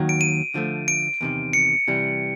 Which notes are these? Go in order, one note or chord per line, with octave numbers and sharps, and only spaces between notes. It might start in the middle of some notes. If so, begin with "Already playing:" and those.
Already playing: D#2 D#3 F#3
D7
D#7
D3 F3 A3
D7
E2 C3 D#3
C#7
C3 E3 G3